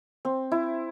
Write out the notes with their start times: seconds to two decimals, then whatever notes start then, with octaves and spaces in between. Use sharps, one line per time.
0.25 C4
0.52 E4